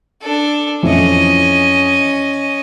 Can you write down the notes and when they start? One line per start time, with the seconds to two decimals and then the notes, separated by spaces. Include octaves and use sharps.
0.22 D4 A4
0.83 F2 E3 C#4 D#5